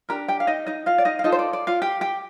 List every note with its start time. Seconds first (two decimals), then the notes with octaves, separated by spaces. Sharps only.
0.09 D4 G4 A#4 A#5
0.28 G4 G5
0.40 F5
0.47 D#4 D#5
0.67 D#4 D#5
0.86 F4 F5
0.98 D5
1.05 D#4 D#5
1.19 F5
1.24 D#4 F4 A4 D#5
1.32 C5
1.39 D5
1.53 D5
1.67 F4 F5
1.82 G4 G5
2.01 G4 G5